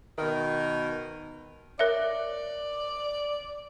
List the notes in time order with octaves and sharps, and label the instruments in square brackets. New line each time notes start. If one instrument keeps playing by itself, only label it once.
[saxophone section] B2 D#3
[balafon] A#4 C#5 E5 [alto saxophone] D5